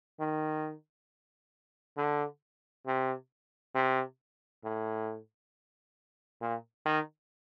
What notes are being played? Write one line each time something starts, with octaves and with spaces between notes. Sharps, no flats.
D#3
D3
C3
C3
A2
A#2
D#3